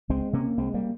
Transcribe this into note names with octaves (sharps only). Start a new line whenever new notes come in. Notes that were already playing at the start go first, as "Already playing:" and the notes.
C#2 G#3 C4
C3 A#3 C#4
C2 G#3 C4
G3 A#3